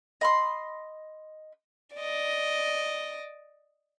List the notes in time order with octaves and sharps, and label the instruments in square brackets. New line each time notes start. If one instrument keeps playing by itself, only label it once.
[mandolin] D#5 B5 C6
[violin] D5 D#5